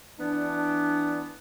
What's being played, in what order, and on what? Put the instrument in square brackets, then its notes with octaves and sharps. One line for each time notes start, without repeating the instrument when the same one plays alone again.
[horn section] E3 B3 D4